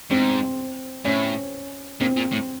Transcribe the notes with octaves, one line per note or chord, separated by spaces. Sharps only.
G#2 C4
A2 C#4
A#2 C4
A#2
A2